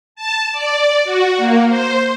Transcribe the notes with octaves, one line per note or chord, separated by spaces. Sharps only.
A5
D5
F#4
A#3
C5